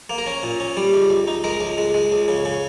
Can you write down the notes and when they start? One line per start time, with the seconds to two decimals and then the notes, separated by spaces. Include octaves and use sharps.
0.10 A#3
0.18 A#4
0.27 C#4
0.43 A#2
0.60 C#4
0.77 G3
0.93 C#2
1.10 C#2
1.28 D#4
1.44 G#3 A#4
1.60 C#2
1.78 G#3
1.94 G#3
2.12 C#2
2.28 C#3
2.45 C#3